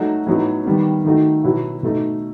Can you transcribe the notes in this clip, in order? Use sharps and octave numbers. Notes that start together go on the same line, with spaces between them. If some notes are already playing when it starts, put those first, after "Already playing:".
Already playing: F#3 A3 D#4 F#4
A2 F#3 B3 D#4
D#3 G3 B3
D#3 A3 D#4 F#4
B2 F#3 B3 E4
B2 A3 D#4